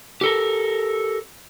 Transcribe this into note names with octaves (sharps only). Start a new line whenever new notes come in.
G4 A4 A#4